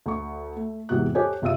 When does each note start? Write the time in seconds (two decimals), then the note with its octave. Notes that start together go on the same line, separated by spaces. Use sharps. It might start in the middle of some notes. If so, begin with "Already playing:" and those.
0.06 D2 C#6
0.57 A3
0.89 E2 G#2 C3 F#4 F#6
1.15 G4 A4 C5 C#5 D#5 G#5
1.42 F#1 C3 F4 E5 E6 D#7